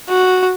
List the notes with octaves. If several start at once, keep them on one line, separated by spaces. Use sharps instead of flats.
F#4